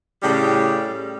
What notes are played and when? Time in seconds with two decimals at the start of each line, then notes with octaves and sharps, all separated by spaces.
0.23 A2 C#3 G3